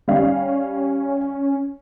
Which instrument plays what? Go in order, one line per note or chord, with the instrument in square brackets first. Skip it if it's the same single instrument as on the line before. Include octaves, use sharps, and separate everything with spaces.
[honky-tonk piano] G3 F5 [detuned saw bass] C#4